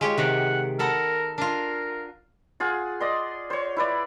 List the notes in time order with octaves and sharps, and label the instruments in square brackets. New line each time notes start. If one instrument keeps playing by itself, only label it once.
[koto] G#3 G4 C#5 [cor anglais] F4
[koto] C3 D#3 [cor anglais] F#5
[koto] B3 A4 F#5 [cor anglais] A#4
[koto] D4 F4 [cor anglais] A#4
[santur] F4 G#4 F#5
D5 D#5 C6
C5 C#5
E4 B4 D5